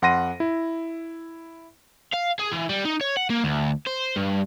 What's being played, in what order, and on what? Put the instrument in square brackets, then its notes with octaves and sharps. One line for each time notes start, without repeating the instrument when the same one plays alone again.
[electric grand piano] F2 F#5 C6 A#6 D#7
E4
[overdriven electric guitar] F5
G#4
E3
G3
D#4
C#5
F#5
A#3
D2
C5
G2